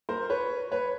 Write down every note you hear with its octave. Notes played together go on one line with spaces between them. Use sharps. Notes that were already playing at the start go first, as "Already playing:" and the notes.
A#4 C5
B4 C#5
B4 C#5